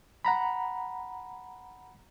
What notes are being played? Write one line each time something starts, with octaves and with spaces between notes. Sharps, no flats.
F#5 A#5 B5